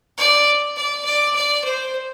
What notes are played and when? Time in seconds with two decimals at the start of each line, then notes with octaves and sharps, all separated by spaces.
0.18 D5
0.76 D5
1.05 D5
1.35 D5
1.64 C5